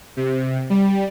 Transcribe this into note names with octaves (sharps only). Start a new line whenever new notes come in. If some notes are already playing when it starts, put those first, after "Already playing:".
C3
G3